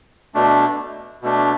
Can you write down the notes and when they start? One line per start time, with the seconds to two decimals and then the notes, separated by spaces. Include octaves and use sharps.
0.34 B2 A3 D4
1.22 B2 A3 D4